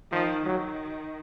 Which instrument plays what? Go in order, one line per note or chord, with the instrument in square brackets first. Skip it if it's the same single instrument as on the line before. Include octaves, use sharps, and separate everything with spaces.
[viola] D#3 [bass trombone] F3
[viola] D#3 [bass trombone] F#3